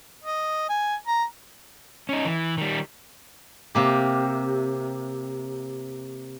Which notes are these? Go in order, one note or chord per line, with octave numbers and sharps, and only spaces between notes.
D#5
G#5
A#5
C#4 D#4
E3
D#3 G3
C3 A#3 G4